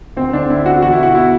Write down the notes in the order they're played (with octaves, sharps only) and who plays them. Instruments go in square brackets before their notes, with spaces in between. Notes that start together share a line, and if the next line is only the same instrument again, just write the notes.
[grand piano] D2 C4
D3 D4
D3 E4
D3 F#4
E2 F#4
E4
B2 F#4
E4